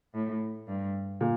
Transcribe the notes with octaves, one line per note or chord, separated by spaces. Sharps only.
A2
G2
A#2